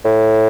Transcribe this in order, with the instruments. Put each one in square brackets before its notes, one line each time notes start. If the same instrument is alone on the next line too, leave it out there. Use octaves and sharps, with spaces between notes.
[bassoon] A2